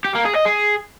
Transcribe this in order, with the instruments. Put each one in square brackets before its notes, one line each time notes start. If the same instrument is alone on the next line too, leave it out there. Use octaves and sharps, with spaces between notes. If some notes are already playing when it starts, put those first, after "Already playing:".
[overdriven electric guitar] G4
A#3
G#4
D#5
G#4